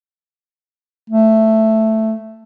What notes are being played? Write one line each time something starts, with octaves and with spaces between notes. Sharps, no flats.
A3